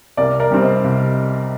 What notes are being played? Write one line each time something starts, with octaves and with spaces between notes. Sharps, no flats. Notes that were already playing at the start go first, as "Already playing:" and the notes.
C2 A#4 D5
A#4 D5
C3 G3 C4
C5 D#5
C2